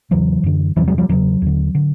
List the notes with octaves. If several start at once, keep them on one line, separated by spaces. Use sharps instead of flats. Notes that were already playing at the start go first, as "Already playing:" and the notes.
E2 C#3 E3 F#3
F#2 D3
E2 C3 E3 F#3
F#3 G#3
F3 G3
E2 C#3 E3 F#3
D#2 D3
D3